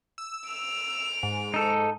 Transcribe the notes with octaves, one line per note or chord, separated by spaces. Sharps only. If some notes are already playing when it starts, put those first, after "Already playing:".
E6
D7 F7
G#2
D#4 A4